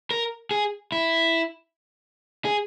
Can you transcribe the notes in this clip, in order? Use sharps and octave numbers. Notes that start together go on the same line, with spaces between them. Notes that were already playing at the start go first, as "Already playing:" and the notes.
A#4
G#4
E4
G#4